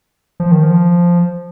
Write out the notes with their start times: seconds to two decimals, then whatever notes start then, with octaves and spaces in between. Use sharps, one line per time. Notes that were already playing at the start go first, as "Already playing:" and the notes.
0.40 F3
0.52 D#3
0.63 F3